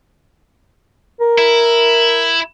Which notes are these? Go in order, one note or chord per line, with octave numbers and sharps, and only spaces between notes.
A#4
E4